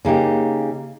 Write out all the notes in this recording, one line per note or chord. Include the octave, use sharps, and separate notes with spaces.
C#3 A#3 D#4 G4